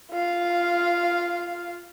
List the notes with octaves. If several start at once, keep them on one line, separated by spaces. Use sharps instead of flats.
F4 F5